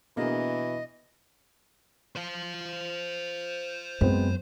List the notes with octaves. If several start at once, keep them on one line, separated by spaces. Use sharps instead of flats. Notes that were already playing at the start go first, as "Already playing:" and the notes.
B2 E3 A#3 D4 G#4 D#5
C5 F5
F#2 G#3 B3 C4